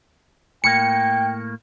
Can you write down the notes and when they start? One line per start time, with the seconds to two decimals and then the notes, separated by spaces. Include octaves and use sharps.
0.64 A2 A#3 G5 C#7